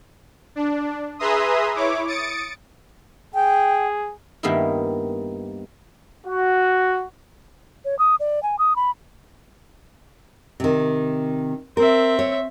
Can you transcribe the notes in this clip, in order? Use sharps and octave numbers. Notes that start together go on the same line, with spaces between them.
D4
G#4 B4 E5 A#5 C6 D#6
E4 C#5 D6
D#6 A6 C#7 D7
G#4 G5
G2 D#3 A#3 B3 D#4 E4
F#4
C#5
D#6
D5
G#5
D#6
B5
C3 D#3
C4 A#4 E5
C#5